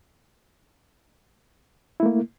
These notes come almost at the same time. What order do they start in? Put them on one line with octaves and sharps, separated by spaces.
E4 A3 A#3